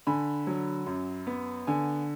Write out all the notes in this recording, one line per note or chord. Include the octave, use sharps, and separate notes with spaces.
D3 G#5 B5
F#3
F#2
B3
D3 G#5